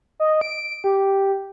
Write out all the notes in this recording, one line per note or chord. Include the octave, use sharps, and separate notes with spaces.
D#5
D7
G4